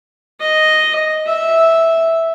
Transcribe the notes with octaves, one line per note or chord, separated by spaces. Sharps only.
D#5
E5